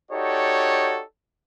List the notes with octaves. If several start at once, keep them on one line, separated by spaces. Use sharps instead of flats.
D#4 F#4 G4 A4 C#5 D5